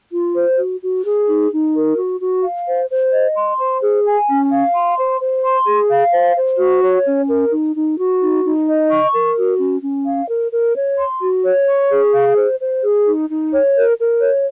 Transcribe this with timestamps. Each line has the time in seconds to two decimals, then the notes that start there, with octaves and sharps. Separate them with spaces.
0.12 F4
0.36 C5
0.59 F#4
0.82 F#4
1.05 G#4
1.28 D#4
1.52 D#4
1.74 A#4
1.98 F#4
2.21 F#4
2.44 F5
2.66 C5
2.90 C5
3.13 D#5
3.36 C6
3.59 C5
3.82 G#4
4.05 G#5
4.28 C#4
4.51 F5
4.74 C6
4.98 C5
5.21 C5
5.44 C6
5.67 G#4
5.90 F5
6.13 C5
6.36 C5
6.59 F#4
6.83 C#5
7.06 C#4
7.29 A#4
7.51 D#4
7.75 D#4
7.98 F#4
8.21 D#4
8.45 D#4
8.67 D#5
8.90 C#6
9.13 A#4
9.36 F#4
9.59 C#4
9.82 C#4
10.06 F5
10.29 A#4
10.52 A#4
10.75 C#5
10.98 C6
11.21 F#4
11.44 C#5
11.67 C#6
11.90 G#4
12.14 F5
12.36 C5
12.60 C5
12.83 G#4
13.06 D#4
13.29 D#4
13.52 C#5
13.75 A#4
13.98 A#4
14.21 C#5